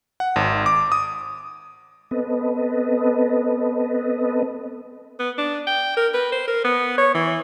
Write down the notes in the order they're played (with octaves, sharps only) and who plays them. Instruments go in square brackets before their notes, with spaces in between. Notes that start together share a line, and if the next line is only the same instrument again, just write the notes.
[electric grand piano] F#5
G#1
D6
D#6
[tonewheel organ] B3 C4 A4 B4 D#5
[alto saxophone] B3
D4
G5
A#4
B4
C5
A#4
B3
C#5
E3